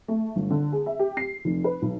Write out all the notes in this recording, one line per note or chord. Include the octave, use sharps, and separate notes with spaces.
A3
G1
D3
G#4
E5
G4
C7
F1
B4
B1